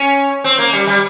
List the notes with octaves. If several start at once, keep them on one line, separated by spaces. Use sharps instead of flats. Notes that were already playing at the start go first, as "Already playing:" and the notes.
Already playing: C#4
C4
A#3
G3
G3